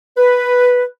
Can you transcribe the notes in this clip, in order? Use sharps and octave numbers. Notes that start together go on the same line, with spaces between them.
B4